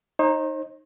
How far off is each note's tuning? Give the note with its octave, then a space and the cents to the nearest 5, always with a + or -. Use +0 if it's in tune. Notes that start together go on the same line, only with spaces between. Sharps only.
D#4 +0 C5 +45